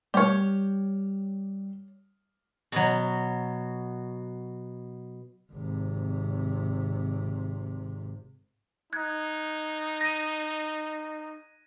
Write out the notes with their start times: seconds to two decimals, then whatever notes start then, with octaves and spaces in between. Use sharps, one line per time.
0.14 G3 G4 C#5 F6
2.72 B2 F#3
5.52 G#1 C3
8.93 D#4 F#6 G#6
10.01 A#6 D#7